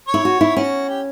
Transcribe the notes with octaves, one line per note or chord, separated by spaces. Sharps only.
C#5
E4
F#4
E4
C#4 F#4
G4